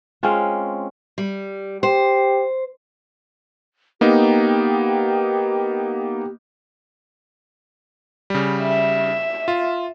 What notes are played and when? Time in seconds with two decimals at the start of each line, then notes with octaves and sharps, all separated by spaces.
0.23 G#3 C4 C#4 F4
1.18 G3
1.83 G4 C5
4.01 A#3 B3 D#4 G4
8.30 C#3 G3
8.63 E5
9.48 F4